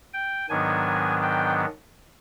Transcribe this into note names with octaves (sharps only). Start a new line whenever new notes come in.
G5
G#2 D#3 F#3 B3 D4 G#5
G5